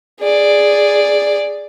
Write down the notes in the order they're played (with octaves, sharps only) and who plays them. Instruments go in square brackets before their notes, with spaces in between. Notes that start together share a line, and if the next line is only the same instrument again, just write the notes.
[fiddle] G#4 D5